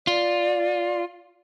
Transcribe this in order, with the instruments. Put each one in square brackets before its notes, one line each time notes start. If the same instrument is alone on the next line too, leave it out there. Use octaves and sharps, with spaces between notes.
[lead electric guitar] F4 [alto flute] D5